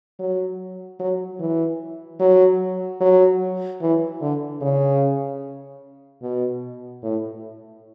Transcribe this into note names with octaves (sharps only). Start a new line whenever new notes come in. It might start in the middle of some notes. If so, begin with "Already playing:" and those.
F#3
F#3
E3
F#3
F#3
E3
D3
C#3
B2
A2